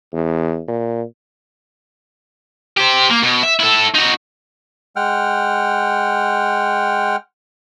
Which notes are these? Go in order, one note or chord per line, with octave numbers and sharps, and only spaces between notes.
E2
A#2
G4 C5
A#3
B2
E5
E4 A4
D#4 F#4
G#3 F#5 G5 F6